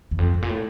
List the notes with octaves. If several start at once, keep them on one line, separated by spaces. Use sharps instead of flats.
E2
F2
G#2
A#2
A2